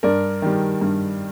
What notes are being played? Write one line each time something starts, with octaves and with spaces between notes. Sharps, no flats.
G2 A#4 D5
D#3 G3
G2